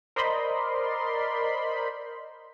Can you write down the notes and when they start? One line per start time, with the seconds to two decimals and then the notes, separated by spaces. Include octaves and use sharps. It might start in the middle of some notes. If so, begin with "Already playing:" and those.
0.16 A#4 C5 D5 D#5 B5 C6